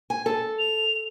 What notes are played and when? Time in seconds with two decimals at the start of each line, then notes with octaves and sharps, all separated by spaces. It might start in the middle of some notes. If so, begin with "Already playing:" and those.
0.10 G#5
0.26 A4
0.59 F7